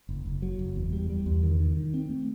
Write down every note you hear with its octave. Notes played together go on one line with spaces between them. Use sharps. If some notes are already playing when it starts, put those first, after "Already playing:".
F#1
F#1
F#3
F#1
E2
G3
G3
E2
D#3
D#3
D#3
C4
A3